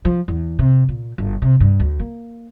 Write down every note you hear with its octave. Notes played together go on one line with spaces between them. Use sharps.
F3
E2
C3
A#2
G1
C3
G2
D2
A#3